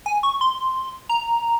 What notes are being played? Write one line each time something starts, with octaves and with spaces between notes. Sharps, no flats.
G#5
C#6
C6
A#5